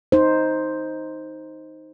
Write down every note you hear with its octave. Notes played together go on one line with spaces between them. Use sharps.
D#4 C5